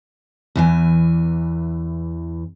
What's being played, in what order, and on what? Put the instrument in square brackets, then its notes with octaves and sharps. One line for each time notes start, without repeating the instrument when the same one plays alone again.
[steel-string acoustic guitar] E2 E3 G#5